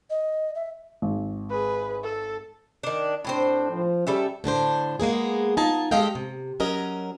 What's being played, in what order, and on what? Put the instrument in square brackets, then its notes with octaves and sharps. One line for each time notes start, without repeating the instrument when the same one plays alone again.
[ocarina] D#5
E5
[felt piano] G#1
[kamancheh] G#4 B4
A4
[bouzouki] D#3 D4
[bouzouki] A2 C4 C5 [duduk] D4
[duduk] F3
[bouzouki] G3 A4 E5 [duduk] C#4
[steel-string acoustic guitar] A2 D3 D4 C5
G#3 A#3 B3 G#4
D#4 F4 G#5 A5
G#3 G4 A4 D#5 F5 G5
C3
F#3 C#4 A#4 D#5